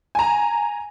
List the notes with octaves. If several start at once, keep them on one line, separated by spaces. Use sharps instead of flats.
G#5 A#5